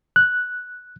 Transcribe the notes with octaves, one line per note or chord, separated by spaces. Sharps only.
F#6